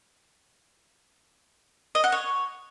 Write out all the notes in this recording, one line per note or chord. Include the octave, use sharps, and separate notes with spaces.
D#5
F#5
C#5